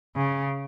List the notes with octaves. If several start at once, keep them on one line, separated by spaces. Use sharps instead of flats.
C#3